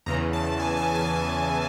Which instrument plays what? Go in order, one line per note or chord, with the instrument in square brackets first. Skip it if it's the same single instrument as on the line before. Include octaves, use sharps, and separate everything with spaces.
[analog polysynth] E2 C#3 E3 A#5
A5
G#5
G#5
A5